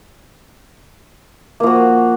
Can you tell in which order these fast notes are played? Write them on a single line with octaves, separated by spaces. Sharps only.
A#3 F3 F#4